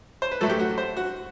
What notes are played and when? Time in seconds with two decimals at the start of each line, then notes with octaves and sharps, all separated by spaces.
0.22 C5
0.31 B4
0.41 A2 F#3 A3 A4
0.50 G4
0.59 F#4
0.78 C5
0.97 F#4